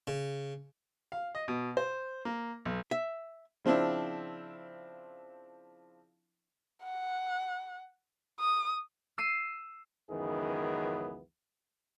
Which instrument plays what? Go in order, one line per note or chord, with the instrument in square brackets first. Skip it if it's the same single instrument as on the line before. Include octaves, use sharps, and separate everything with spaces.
[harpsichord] C#3
[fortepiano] F5
D#5
B2
C5
A#3
B1
[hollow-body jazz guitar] E5
[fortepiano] C#3 F3 C4 D4 E4
[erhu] F#5
D#6
[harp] E6 C7 D#7
[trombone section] C#2 F#2 D#3 E3 B3 G#4